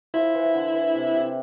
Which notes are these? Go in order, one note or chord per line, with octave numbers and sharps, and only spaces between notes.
F3 E4
E3
D3
E3
C3
C3